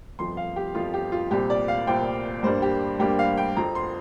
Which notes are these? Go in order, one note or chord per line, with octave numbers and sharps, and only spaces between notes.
G1 F2 F3 C6
F5
G4
G1 F2 F3 F4
G4
F4
C2 A#2 G3 C4 G4
D5
F5
C2 A#2 G3 C4 G5
G2 G3 A#3 D4 C5
G4
G2 G3 A#3 D4 G4
F5
G5
F2 F3 C4 A#5
C6